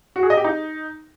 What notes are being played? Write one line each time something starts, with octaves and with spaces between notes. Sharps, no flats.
F#4
G#4
D#5
G4
D#4